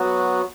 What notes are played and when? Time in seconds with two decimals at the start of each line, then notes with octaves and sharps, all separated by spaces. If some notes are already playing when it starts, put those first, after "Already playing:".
Already playing: F#3 B3 F#4